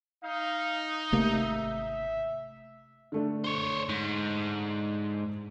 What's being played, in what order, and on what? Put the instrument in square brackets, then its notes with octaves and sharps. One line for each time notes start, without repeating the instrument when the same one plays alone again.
[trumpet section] D#4 [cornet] F5
[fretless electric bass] G#1 C3 A#3 [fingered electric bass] A3 [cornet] E5
[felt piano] D3 A3 D4
[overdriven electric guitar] C5 C#5
G#2